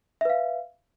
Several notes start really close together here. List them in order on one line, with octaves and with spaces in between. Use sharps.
E5 B4 F5